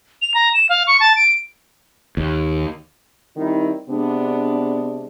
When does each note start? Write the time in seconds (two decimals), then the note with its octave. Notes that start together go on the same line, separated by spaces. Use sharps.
0.22 F7
0.34 A#5
0.54 E7
0.69 F5
0.87 C#6
1.00 A5
1.16 D7
2.17 D#2
3.36 D#3 G3 C4 D#4 E4
3.89 C3 G#3 B3 D4